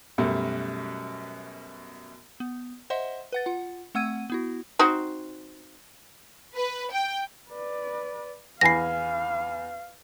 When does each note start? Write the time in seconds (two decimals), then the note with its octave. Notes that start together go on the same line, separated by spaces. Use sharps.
0.18 F#2 B2 G3 A3
2.40 B3
2.90 C5 D#5 E5 F#5 C6
3.32 B4 F#5 A6
3.46 F4 F#5
3.95 A3 C4 F#5 E6 G#6 D#7
4.30 B3 E4 F#4
4.79 C4 D#4 F#4
6.55 B4
6.92 G5
7.50 B4 D5
8.61 E2 F5 G#5 B5 A#6 C7